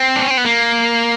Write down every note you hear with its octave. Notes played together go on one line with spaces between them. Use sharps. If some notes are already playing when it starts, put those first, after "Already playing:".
Already playing: C4
D4
C#4
C4
B3
A#3